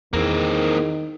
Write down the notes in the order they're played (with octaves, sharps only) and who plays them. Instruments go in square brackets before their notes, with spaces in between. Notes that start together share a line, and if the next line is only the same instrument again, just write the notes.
[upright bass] E2 G3 [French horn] D#3 [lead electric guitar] A#3 C4 [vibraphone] E4 G#4 A#4